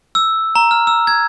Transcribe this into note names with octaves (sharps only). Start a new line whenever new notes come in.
E6
A#5
F6
E6
G#6